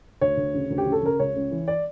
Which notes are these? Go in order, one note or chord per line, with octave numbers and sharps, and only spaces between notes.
D2 C#5
D2
C#3
D2
G4
C#3
A4
C#3 A#4
C#2 C#5
C#2
E3
D5